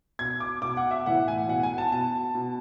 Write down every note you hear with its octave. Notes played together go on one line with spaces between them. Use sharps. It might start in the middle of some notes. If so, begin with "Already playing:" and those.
B2 G#6
D6
B2 D6
F#5
E5
A2 E3 F#5
G#5
B2 F#5
G#5
A5
B2 A5
B2